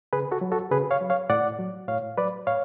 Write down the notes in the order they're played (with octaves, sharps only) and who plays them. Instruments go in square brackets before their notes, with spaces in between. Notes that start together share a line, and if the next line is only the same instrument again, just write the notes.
[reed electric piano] C#3 G#4 B4
F#4 A4
F#3
F#4 A4
C#3 G#4 B4
C#5 F5
F#3
C#5 F5
A2 D5 F#5
F#3
A2 C#5 F5
F#3 B4 D5
A2 C#5 F5